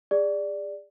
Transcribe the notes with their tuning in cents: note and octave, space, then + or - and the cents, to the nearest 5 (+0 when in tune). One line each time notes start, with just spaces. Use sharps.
G#4 -30 D5 +0